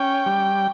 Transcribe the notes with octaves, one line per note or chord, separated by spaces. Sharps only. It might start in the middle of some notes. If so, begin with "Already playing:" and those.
Already playing: C#4 G5
G3